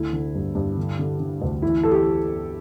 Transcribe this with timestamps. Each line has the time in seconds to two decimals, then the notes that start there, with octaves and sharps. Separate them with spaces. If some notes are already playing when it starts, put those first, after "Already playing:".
Already playing: D2 D3 E4
0.13 D3
0.35 G2
0.55 G2
0.77 D3
0.99 D3
1.20 D3
1.42 D2
1.62 E3 E4
1.83 E3 A4
1.91 G4